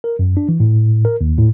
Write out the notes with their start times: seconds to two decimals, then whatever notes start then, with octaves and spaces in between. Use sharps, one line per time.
0.04 A#4
0.19 F#2
0.37 D4
0.49 E3
0.60 A2
1.05 A#4
1.21 D#2
1.38 A2